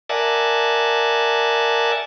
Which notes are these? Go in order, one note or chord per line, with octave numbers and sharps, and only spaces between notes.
A#4 D5 E5 F#5 G#5 A5